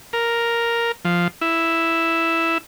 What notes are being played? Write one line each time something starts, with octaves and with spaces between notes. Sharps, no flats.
A#4
F3
E4